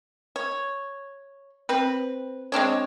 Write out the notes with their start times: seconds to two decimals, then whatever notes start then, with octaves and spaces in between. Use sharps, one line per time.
0.36 C#5
1.69 C4 B4
2.52 G#3 C4 D4 C#5